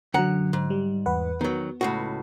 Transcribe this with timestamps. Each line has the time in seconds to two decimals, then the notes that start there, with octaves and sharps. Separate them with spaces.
0.14 F#2 D3 F#3 F#5 A#5
0.53 G#2
0.70 G3
1.06 E2 B4 F#5
1.41 D#3 F#3 B3
1.81 C#2 A2 F#4